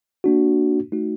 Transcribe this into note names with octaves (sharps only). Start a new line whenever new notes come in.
A#3 D4 F#4
A3 D#4 F#4